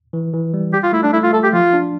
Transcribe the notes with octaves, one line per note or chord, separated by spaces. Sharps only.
E3
E3
G3
G3 G4
F4
A3 E4
D4
A3 E4
F4
A3 A4
G4
F3 F4
D4